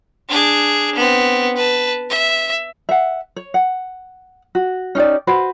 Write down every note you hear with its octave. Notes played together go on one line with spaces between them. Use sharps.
D4 G#4
B3 C4
B4 A5
E5
E5 F#5
C#5
F#5
F#4
C#4 D#4 G4 D5
F#4 B4 C5